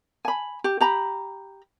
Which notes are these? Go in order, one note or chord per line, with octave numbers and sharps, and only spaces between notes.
G#5 B5
G4
G4 A#5 B5